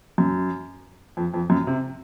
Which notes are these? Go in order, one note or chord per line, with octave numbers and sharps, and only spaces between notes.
F#2
F2
F2
F#2
C3